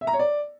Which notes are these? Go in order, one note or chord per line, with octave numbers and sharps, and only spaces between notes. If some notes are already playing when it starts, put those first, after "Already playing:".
E5
A#5
C#5
D5